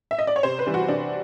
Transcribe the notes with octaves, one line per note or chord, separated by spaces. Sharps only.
E5
D#5
D5
C#5
C3 C5
B4
E3 G3
F#4
C3 D4